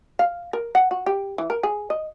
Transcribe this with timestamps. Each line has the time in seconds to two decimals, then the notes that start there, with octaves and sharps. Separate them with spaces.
0.19 F5
0.53 A#4
0.75 F#5
0.91 F#4
1.06 G4
1.38 E3
1.50 A#4
1.63 G#4
1.90 D#5